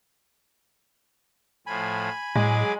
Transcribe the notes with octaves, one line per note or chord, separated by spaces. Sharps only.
A2 F3 G#5 B5
A2 F#3 G#3 G#4 D6